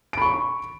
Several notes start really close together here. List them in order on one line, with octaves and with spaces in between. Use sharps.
D7 B5 C#6